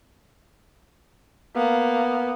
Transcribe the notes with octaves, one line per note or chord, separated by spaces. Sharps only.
A#3 B3